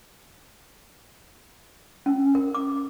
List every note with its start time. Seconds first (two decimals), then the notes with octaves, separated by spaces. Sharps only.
2.06 C#4
2.35 A#4
2.55 D6